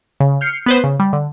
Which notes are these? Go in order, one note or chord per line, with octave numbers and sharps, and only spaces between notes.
C#3
F6 G6 C7 C#7
B3 B4 C5
C#3
G3
D3